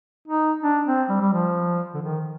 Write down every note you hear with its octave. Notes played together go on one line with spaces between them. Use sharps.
D#4
D4
C4
G3
G3
F3
D3
D#3